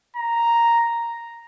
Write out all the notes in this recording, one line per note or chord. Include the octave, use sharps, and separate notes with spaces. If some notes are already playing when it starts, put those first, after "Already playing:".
A#5